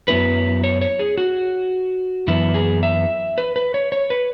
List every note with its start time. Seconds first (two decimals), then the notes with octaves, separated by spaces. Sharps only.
0.08 F#2 F#3 B3 E4 B4
0.64 C#5
0.82 C#5
0.99 G#4
1.18 F#4
2.28 F#2 E3 B3 E4
2.54 G#4
2.83 E5
3.38 B4
3.56 B4
3.74 C#5
3.92 C#5
4.10 B4